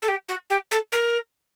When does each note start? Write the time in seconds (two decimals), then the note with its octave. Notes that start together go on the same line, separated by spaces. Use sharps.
0.02 A4
0.08 G4
0.29 F#4
0.50 G4
0.71 A4
0.92 A#4